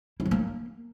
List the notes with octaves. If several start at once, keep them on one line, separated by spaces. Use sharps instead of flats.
E4
F3
A#3